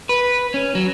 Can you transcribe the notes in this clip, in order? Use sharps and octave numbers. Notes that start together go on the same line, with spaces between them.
B4
C#4
F#3